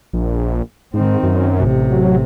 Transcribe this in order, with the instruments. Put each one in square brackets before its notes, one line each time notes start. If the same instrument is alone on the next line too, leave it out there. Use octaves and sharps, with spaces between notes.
[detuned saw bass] A#1
[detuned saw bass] G#2 [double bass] D#3 C4
[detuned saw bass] F#2
[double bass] A1 C3
[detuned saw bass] F#3